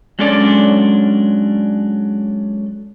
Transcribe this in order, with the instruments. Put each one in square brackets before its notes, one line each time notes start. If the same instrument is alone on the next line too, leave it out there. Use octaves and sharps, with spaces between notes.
[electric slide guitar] F#3 G#3 C#4 D4 A4 D5